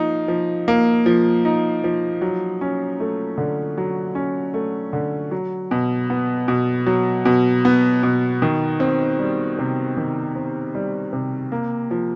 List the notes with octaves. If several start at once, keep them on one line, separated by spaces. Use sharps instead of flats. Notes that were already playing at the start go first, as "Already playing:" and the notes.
Already playing: F3 A#3 D#4
F3
A#3
F3
D#4
F3
F#3
C#4
A3
D3
F#3
C#4
A3
D3
F#3
B2
B3
B2
F#3
B2
B3
B2
D#3
C4
G3
C3
D#3
C4
G3
C3
A#3
F3